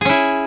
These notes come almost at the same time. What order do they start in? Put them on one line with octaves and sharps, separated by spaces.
G#4 C#4 E4